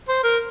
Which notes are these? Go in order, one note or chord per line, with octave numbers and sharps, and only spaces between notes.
C5
A#4